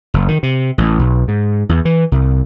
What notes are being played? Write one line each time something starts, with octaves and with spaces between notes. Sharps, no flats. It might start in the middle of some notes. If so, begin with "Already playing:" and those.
F#1
D#3
C3
A1
B1
G#2
E2
E3
C2